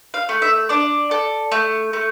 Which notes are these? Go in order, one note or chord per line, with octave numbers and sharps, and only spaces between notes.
F5
A3
E5
D4 D5
A4
A3
A3